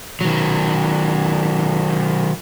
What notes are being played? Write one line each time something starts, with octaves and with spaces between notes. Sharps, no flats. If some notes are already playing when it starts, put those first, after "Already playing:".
D#3 F#3